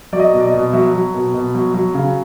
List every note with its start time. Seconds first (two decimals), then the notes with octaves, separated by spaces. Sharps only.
0.13 F#3 D5
0.20 D#5
0.33 B2
0.40 D5
0.46 D#5
0.54 B2
0.73 F#3 E5
0.93 F#3
1.14 B2
1.34 B2
1.54 F#3
1.74 F#3
1.94 C#3